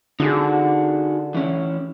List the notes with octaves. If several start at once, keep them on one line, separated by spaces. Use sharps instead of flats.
D3 D#4 F#4 G#4
E3 C#4 E4